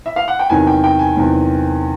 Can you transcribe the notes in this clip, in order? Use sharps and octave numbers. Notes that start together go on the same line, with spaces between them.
E5
F5
F#5
G5
E2 C3 D#3 F#3 G#5
G5
G5
G#5
E2 C3 D#3 F#3